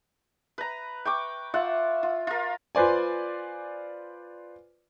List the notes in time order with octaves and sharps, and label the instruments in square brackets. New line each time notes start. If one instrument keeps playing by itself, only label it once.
[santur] B4 A#5
G5 C#6 D6
F4 E5 F#5
F4
F4 A#4
[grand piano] F4 B4 C5 D5 G#5